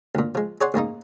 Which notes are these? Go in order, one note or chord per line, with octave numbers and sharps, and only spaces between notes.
D2 A#2
F3 G#3
G#4 C#5 D5 F#5 G#5 C6
A1 G#2 A#3 D#4